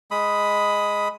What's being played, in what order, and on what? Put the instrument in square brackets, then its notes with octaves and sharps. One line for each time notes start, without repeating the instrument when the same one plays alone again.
[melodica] G#3 B5 D#6